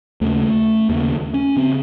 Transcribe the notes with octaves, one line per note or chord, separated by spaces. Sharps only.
D#2 C#3 A3
D#2 C#3 A#3
C#4
C#3 C4